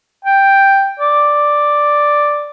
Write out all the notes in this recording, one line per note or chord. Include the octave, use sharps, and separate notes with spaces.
G5
D5